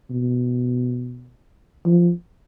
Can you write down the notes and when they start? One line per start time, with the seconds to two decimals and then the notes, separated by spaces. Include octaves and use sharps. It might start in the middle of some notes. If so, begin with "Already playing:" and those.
0.10 B2
1.86 F3